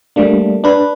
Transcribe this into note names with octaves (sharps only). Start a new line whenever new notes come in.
G3 A3 A#3 D4
D4 B4